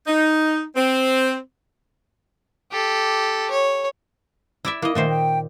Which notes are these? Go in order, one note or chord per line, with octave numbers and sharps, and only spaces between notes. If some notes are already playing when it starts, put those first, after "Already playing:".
D#4
C4
G4 A4
C#5
E4 D5 E5
A#3 E4 D#5
A#2 D#3 A3 C5
G5